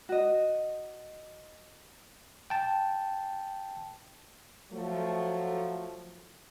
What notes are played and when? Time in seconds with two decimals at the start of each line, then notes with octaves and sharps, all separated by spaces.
0.09 F#4 D#5
2.50 G5 A5
4.73 F3 F#3 A3